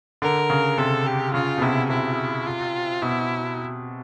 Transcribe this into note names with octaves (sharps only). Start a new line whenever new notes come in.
D3 A#4
C#3
C3 A4
G4
C#3 F4
B2
C3 E4
C3 E4
F4
B2 E4